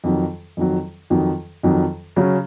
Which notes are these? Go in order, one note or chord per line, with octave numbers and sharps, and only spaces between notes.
F2 D#3 F#3
F2 D#3 F#3
F2 D#3 F#3
F2 D#3 F#3
C#3 F#3 C#4